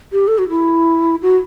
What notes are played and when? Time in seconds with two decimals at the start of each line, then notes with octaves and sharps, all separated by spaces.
0.12 G4
0.28 A4
0.38 F#4
0.49 E4
1.22 F#4